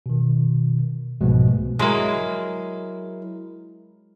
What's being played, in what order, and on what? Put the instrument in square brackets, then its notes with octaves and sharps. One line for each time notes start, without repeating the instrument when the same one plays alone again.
[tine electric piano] B2 D#3
C2 G#2 B2 F3 G#3 A3
[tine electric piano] F#3 E4 A#4 [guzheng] G#3